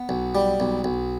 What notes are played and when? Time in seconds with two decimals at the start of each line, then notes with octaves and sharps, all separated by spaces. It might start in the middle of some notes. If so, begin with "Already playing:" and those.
Already playing: B3
0.09 B1
0.35 G3
0.60 B1
0.84 B1